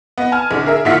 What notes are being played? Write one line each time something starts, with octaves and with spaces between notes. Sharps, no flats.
B3 D#5
G#5 A5 F6
A#1 D3
G#4 A#4 E5
A#2 D#3 F4 E5 F#5 B6